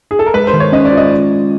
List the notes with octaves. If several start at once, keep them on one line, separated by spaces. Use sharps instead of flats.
G#4
A4
A#4
G#3 B4
C5
D#3
C#5
C#4 D#5
D5
F4
D#5